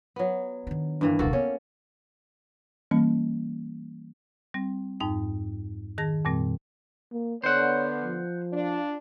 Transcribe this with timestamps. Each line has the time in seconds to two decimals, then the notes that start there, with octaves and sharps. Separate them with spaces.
0.16 F#3 B3
0.67 D#3 D4
1.01 G2 E3 A#3
1.19 D#1 C2 A#3 F#4 A4
1.33 B3 C#4 C#5
2.91 E3 G3 A#3 C#4
4.54 G3 C4
5.00 F2 G#2 D#4 G5
5.98 D#3 G#4 A5 A#6
6.25 F2 A#2 G3 C4
7.12 A#3
7.44 D3 B3 C5 C#5 F#5
8.02 F3
8.52 D4 F4